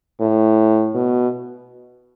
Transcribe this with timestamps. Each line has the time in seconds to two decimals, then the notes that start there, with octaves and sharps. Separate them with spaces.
0.20 A2
0.94 B2